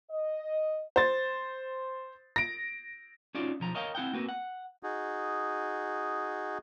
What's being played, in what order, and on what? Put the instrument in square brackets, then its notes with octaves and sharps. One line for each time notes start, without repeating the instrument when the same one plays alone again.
[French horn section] D#5
[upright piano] C5 A6
A#6 D7
[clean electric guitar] C#4 D#4 F4 F#4 D5
B1 F3 A#5
A#4 C#5 D#5 F5 G5 A#5
C4 E4 F#5 G5
A#3 C4 F#4 B4
F#5
[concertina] D#4 F#4 G#4